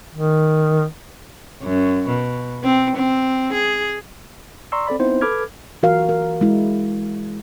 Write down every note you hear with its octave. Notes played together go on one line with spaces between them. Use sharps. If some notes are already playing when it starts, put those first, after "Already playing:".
D#3
F#2
B2
C4
C4
G#4
D5 A#5 C6 C#6 E6
C4 A4 D5 B5
B3 C4 D#4 E4 C5
A4 B4 B5 D6 F6 G#6
E3 F#4 A#4 F5
A#4
G#3 E4